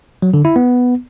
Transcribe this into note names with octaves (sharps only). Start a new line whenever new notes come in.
F#3
D3
E4
B3